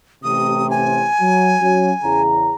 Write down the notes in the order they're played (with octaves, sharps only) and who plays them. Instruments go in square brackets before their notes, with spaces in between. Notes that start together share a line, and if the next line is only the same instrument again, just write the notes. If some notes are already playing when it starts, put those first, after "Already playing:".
[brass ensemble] A1 A2 C3 [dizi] D#6
[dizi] G#5
[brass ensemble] F#3
F#3 C#4 F#4
E2 C#3 A#5